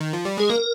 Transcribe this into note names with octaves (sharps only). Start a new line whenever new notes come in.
D#3
F3
G3
G#3 G#4
A#3 A#4